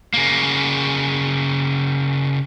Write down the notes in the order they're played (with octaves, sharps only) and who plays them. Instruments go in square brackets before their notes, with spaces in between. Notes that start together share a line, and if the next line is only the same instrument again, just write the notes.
[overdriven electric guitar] C#3 A#3